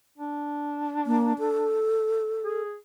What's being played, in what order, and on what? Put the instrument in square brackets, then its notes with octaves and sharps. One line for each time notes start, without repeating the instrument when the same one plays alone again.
[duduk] D4
[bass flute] A#3
A4
[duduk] G#4